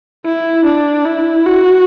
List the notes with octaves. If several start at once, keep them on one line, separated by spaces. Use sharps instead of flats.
E4
D4
E4
F#4